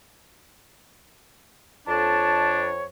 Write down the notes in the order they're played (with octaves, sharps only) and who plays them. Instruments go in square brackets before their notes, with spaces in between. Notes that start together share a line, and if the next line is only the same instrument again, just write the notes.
[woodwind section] F2 [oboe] D4 [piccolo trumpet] C#5 [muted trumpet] A5